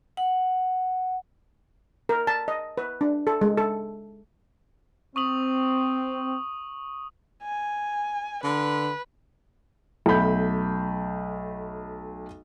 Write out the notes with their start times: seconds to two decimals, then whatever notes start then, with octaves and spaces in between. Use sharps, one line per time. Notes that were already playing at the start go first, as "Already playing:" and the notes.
0.17 F#5
2.09 A#4
2.27 A5
2.48 D#5
2.78 B4
3.01 D4
3.27 A4
3.41 G#3
3.58 A4
5.16 C4 C#6 D#6 F#7
7.43 G#5
8.44 D3 B4
10.06 B1 A3 B5 G6